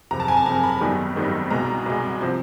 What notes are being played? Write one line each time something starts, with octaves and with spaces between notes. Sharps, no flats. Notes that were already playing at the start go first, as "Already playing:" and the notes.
F#1 F2 C3 A#5
A5
G#5
A5
F#1 F2 C3 A#5
B5
G#1 F#2 D#3 G3 B3
G#1 F#2 D#3 G3 B3
C2 B2 G#3 A#5
C2 B2 G#3
C3 F3